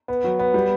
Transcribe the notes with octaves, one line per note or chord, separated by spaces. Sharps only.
B3
F#3
B3
G3